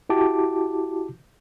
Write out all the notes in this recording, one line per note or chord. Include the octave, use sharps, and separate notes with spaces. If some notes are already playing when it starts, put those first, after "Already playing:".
E4 F#4 G4 A5 D6